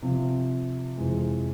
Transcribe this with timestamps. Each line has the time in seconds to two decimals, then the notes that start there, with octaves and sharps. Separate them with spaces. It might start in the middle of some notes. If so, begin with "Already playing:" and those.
0.02 C3 F3 C4
0.97 F2 C3 E3 G#3